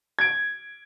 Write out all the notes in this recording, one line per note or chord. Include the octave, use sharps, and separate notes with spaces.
G#6 D7